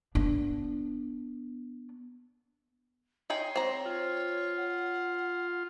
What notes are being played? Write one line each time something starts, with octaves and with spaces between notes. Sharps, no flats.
B3 D4
D#4 G#4 C#5 G5 C6
C4 A#5
F4
F#5